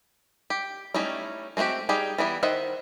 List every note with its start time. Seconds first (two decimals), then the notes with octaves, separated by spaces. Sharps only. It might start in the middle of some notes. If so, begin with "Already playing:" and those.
0.50 G4
0.94 G3 A3 C#4 D#4 E4
1.57 G#3 A3 C4 F#4 G4
1.89 G3 D#4 G4 G#4
2.18 E3 G3 B3 E4
2.43 D#3 C5 D#5 E5 F#5